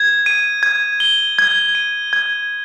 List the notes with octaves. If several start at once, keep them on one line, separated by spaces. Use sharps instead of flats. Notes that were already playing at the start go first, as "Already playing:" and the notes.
Already playing: G#6
D#7
G#6
G7
G#6
D#7
G#6